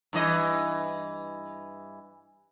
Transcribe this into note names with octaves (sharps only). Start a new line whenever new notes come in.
G2 E3 D#5